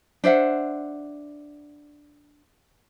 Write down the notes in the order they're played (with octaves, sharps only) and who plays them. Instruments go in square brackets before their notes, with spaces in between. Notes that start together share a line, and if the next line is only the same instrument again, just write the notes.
[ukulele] D4 C5 E5 F#5